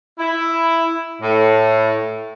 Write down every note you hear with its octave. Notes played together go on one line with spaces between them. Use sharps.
E4
A2